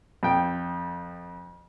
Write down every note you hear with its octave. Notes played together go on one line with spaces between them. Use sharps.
F2 G5